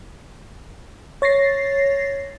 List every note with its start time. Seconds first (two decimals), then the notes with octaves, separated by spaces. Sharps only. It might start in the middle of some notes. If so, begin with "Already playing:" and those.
1.22 C#5 A6 A#6 C7